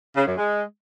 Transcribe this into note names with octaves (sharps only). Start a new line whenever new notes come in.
C#3
F#2
G#3